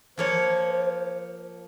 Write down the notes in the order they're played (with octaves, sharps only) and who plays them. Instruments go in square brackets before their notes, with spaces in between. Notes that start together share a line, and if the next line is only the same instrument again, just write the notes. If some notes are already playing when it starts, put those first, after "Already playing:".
[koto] F3 A#3 C#5 [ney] C5